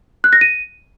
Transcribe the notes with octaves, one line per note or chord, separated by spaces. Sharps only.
F#6
A#6
D#7